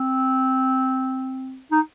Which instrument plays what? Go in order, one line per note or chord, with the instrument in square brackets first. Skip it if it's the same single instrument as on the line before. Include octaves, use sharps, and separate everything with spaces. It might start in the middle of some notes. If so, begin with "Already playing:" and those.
Already playing: [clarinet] C4
D#4